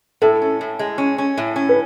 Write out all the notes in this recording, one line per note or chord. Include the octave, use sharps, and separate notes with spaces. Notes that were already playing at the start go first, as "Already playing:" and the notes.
A2 A4
C#4
A2
G#3
C#4
C#4
A2
C#4
B4